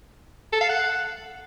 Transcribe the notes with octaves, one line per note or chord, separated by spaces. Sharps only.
A4
F5
F#5